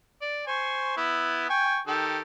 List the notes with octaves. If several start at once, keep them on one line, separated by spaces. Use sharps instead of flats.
D5
C5 G#5 C#6
B3 E4
G5 G#5 C#6
D#3 G4 A4